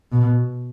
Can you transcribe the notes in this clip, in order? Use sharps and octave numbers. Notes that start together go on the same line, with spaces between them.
B2